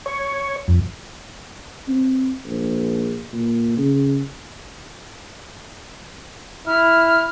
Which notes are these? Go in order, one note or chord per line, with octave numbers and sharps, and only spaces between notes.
C#5
F2
C4
A#1
A#2
C#3
E4 F6